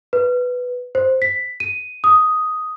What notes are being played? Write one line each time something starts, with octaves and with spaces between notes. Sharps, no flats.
B4
C5
B6
D#7
D#6